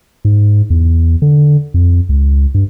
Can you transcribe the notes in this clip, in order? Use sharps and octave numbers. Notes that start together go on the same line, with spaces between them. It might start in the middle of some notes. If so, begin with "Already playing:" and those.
G#2
E2
D3
F2
C#2
G2